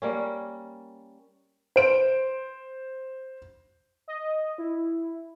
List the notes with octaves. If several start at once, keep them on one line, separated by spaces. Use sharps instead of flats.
G3 A#3 C#4
C5 D7
D#5
E4